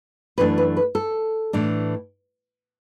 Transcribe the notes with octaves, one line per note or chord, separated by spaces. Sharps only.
F#2 E3 A3 D4 B4
B4
B4
A4
A2 E3 D4